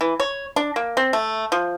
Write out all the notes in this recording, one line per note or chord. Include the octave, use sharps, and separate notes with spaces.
E3
C#5
D4
A#3
C4
A3
F3